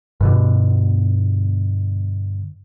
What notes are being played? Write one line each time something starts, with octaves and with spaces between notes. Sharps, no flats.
G2 B2 D3